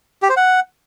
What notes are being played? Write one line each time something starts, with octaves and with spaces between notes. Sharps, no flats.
G4
C5
F#5